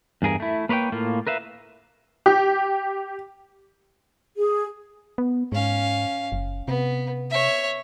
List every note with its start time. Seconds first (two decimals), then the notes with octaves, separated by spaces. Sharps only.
0.22 E2 G2 G#4 A#4
0.40 A3 E4
0.69 A#3 B4 C#5 D5 G5
0.92 A2 A#3 F4
1.27 A#4 B4 E5 F5
2.26 G4
4.36 G#4
5.18 B3
5.52 G#2 C#4 F5
6.32 F#1
6.68 C3 B3
7.31 C#5 E5